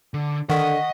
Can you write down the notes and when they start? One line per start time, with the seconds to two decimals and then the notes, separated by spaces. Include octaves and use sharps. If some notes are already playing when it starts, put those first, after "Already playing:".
0.14 D3
0.50 D3 D#3 D#5 F#5 C#6 B6